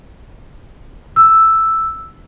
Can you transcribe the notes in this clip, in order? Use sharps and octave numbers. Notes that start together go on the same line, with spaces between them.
E6